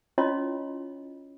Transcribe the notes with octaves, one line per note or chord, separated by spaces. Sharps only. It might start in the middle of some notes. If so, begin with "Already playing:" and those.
C#4 E4 F4 C#5 D#5 C6